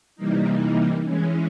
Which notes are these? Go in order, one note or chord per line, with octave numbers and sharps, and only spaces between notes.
C3 E3 G3 A#3 D#4
E3 G#3 C#4